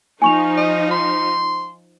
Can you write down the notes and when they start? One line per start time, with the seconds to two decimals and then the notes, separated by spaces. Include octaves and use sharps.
0.22 F3 D#4 G#5 C#6 F7
0.58 D#5
0.91 C6